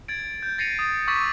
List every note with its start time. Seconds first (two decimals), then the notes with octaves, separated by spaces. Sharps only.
0.08 G#6 A6 D7
0.43 G6
0.58 A6 A#6 C7 C#7 D#7 F7
0.79 D#6 A6
1.08 C#6 D6 E6 A6 B6 D#7